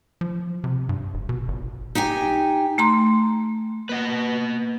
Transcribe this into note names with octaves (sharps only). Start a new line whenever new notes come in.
F3
C3
G2
F1
B2
G1
D#4 G4 G5 G#5
A3 A#5 C6
A#3 B4 D#5 F#5